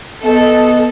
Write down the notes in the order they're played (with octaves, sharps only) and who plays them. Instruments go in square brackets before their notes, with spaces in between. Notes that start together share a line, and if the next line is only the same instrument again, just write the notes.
[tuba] B3 [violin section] A4 [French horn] D#5